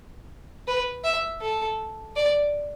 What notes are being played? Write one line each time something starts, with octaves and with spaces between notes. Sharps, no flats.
B4
E5
A4
D5